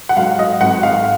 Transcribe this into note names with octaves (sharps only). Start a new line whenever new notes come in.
F#5
G#2 F#3 F5
D#5
G#1 F#5
F5